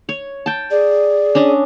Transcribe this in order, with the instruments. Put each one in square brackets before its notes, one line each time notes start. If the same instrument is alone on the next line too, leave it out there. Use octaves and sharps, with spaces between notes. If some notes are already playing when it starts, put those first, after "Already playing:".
[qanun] C#5
G5 A5
[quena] G#4 [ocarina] D5
[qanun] C#4 D4 D#5